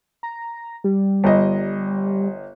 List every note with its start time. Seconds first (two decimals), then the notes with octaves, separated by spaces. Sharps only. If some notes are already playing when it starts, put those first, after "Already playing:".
0.23 A#5
0.84 G3
1.24 G1 D#5